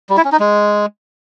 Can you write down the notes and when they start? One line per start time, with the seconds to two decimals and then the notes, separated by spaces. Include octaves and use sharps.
0.10 G3
0.17 E4
0.25 C#4
0.32 D#4
0.40 G#3